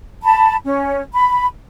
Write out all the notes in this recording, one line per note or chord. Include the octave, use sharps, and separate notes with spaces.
A5 B5
C#4
B5